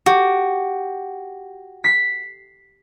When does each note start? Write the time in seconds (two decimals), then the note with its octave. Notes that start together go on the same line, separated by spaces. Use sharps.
0.06 F#4 G4
1.84 B6 C7